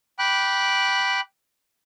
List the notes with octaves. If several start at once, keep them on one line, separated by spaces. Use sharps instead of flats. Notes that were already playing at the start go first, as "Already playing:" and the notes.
G5 B5 D6 F#6